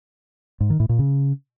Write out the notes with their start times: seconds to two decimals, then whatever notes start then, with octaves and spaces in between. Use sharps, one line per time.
0.60 G#2
0.70 D#3
0.80 A2
0.89 A#2
0.99 C#3